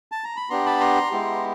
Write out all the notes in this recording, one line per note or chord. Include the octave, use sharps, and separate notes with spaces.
A5
A#5
B5
B3 D4 G4 A#5 C6
A5 B5
A#5 C6
G#3 B3 E4 G4